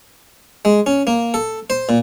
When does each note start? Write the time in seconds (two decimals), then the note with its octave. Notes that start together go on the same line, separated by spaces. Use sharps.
0.65 G#3
0.86 C#4
1.07 A#3
1.34 A4
1.70 C5
1.89 A#2